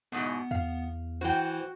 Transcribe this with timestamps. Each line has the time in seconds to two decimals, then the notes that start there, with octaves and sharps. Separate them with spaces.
0.12 E2 G#2 B2 B3
0.51 E2 F5
1.21 E3 E4 F#4 C5 G5